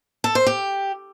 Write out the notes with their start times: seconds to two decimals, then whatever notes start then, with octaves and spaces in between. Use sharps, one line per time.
0.24 A4
0.35 C5
0.46 G4